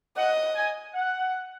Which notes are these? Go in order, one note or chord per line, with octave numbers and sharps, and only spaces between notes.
D#5 F#5
G#5
F#5